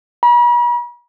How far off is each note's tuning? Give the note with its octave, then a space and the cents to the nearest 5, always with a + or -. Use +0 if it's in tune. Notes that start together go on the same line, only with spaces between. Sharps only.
B5 -45